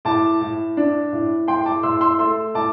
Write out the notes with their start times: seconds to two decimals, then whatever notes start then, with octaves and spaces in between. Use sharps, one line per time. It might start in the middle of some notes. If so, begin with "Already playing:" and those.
0.05 A2 A5 D6
0.41 A2
0.77 D4
1.13 A2
1.48 A2 G5 C6
1.66 A5 D6
1.83 A2 C6 E6
2.01 C6 E6
2.19 A3 C6 E6
2.54 A2 A5 D6